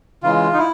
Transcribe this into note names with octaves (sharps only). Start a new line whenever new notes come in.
C#3 E3 G#3 F4
D#4
E4